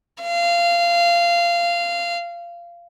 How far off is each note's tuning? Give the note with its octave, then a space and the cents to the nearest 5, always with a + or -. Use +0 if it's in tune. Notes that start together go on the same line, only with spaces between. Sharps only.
F5 -20